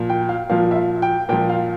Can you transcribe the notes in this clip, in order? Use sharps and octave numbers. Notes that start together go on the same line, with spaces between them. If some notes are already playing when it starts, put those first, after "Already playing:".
Already playing: A#2 F3
G5
F5
A#2 F3 F5
E5
F5
G5
A#2 F3 G5
F5